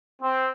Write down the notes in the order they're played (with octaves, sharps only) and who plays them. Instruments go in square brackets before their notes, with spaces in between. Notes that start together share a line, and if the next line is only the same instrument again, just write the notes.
[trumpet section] C4